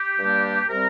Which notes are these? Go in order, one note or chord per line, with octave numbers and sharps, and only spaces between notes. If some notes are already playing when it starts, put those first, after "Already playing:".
Already playing: G4
G2 G3 A#3 D4
C3 G3 C4 A#4